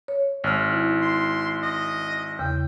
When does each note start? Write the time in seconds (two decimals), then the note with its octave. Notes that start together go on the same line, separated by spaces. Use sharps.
0.08 C#5
0.44 G#1 F6
0.72 E4
1.02 C6
1.63 D#5
2.39 E2 C#3 G5